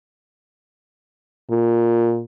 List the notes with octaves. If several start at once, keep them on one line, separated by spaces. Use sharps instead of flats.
A#2